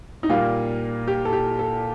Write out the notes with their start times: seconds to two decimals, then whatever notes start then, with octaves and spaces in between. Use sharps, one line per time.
0.23 D#4
0.29 A#2 G3 A#3 F4
1.08 G4
1.25 A4
1.33 G4
1.59 A4